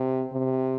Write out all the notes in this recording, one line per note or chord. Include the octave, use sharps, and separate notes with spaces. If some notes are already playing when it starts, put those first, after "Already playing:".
Already playing: C3
C3